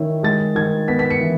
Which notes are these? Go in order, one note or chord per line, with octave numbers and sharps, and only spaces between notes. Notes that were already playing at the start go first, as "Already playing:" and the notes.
Already playing: D#3 C#4 E4
G#3 A6
D#3 G#6
B3 B6
B6
C#7
E3